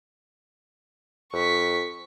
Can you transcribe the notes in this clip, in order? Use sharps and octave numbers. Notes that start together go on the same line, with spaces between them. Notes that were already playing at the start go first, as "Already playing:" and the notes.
F2 C#6 B6